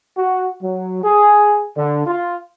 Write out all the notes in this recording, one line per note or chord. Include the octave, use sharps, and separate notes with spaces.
F#4
F#3
G#4
D3
F4